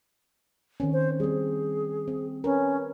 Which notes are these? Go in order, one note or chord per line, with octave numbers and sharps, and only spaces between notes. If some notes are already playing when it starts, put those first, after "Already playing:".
D#3 C4 C#4
C5
G3 C4 G#4
C4
C#4 A#4 B4